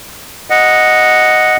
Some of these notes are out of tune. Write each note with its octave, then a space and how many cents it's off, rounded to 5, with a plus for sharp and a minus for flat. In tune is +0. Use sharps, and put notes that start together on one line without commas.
D#5 +0 F#5 -5